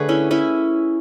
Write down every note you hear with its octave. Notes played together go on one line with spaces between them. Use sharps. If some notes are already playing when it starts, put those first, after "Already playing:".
Already playing: D3 A3 G#4 B4 C#5
C#4 E4
C#4 E4